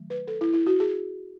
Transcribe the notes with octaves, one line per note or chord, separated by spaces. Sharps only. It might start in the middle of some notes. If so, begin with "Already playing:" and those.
Already playing: D#3 F#3 A3
B4
A4
E4
E4
F#4
G#4